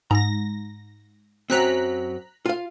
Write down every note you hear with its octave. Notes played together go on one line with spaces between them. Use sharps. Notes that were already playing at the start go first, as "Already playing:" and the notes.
G#2 A#5 A#6
F#2 F#3 C4 A#5 F#6 B6
F4 F5